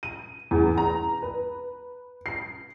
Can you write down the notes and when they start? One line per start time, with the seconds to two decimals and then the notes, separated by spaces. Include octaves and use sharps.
0.03 D#7
0.51 E2
0.78 A#5
1.22 B4
2.26 C7